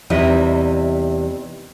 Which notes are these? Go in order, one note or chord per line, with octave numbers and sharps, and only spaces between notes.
E2 C3 G3 D#4 E4 D#5